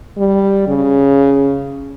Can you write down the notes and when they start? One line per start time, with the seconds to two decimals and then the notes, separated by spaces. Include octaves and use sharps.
0.18 G3
0.67 C#3